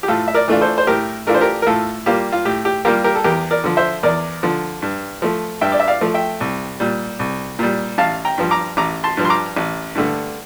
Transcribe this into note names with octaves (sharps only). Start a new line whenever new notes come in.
G4
A2 F4 A4
E5
A#4 D5
E3 A3 D4 F4
A4 C5
C5
A2 G4 A#4
E3 A3 D4 F4 A#4
C5
G4 A#4
A#4
A2 F4 A4
G3 A#3 F4 G4
F4
A2 G4
G4
G3 A#3 F4 G4 A#4
G4 A#4
A4
E2 G4 A#4
A#4 D5
D3 F3
C5 E5
E2 A#4 D5
D3 F3
G2
F3 A3
G2 E5 G5
D5
E5
D5 F5
F3 A3
E5 G5
C2
A#2 G3
C2
A#2 G3
A1 F5 A5
G5 A#5
G2 F3
A#5 D6
A1 A#5 D6
A5 C6
G2 F3
C6
A#5 D6
A1
G2 D3 A3